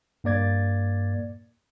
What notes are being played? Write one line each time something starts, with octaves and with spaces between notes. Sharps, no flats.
G2 A#3 D5 G#6 A6